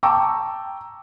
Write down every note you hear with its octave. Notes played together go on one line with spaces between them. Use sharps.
G5 A5 A#5 C#6 D6 E6